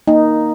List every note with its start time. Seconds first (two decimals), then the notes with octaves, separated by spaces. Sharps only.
0.08 A#3 D#4